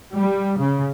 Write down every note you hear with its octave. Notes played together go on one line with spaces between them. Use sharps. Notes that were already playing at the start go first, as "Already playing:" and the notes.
G3
C#3